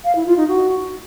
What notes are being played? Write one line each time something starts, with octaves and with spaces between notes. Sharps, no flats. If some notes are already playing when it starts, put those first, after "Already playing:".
F5
E4
F4
D#4
F#4